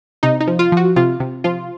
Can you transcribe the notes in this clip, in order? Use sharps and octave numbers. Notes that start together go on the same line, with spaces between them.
C3 D#4
D#4
F3
F4
F3 F#4
C3 F4
C3
F3 F4